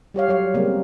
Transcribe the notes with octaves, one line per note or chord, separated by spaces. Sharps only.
G3 G4 C#5 F5
F#3 C#5 F5
C#3 G3 G#3 A#3 C4